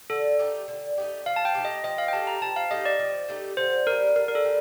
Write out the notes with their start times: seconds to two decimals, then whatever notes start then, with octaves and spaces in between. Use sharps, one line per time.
0.10 D3 A4
0.39 A3 D#4 G4
0.68 D3
0.98 A3 D#4 G4
1.26 F3 F5
1.36 A5
1.45 G5
1.55 A3 D#4 G4
1.65 D#5
1.84 F3 D#5
1.98 F5
2.08 G5
2.13 A3 D#4 G4 A5
2.27 A#5
2.42 F3 A5
2.56 F5
2.71 A3 D#4 G4 D#5
2.85 D5
2.99 F3
3.28 A3 D#4 G4
3.57 D3 C5
3.86 G3 A#3 A#4
4.16 D3 A#4
4.28 A#4
4.35 A4
4.45 G3